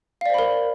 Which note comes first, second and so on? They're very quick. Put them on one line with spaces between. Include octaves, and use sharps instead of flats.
F5 D5 C5 B5 A#4